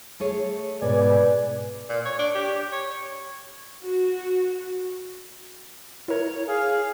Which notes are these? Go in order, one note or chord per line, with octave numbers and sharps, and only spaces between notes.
A3 G#4 C#5
G#2 B2 B4 D5 G#5
A#2
C#5
D4
G4
C#5
F#4
E4 A#4 C#5
G#4 F5